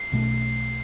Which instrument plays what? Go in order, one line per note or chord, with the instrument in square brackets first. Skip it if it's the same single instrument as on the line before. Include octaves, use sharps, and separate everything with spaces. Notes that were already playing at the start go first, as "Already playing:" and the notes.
Already playing: [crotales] C7
[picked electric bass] B1 B2 A3